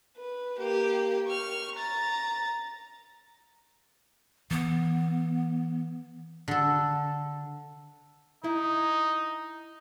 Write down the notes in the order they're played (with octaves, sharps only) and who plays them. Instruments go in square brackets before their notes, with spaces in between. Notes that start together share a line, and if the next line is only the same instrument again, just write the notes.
[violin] B4
A#3 G4
C#6 F6
A#5 A6
[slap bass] E3 [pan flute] B3
[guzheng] D3 A4
[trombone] D#4 [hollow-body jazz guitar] E4